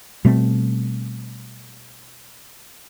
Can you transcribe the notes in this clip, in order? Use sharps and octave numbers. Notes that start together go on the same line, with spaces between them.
B2 G3 A3 C4